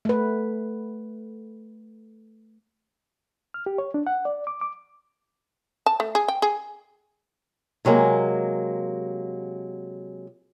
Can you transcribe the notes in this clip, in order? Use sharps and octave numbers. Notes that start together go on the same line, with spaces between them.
A3 B4
F6
G4
C#5
D4
F#5
D5
D6
D6
A5
A3
G#4
G5
G#4
C3 F#3 G#3 A#3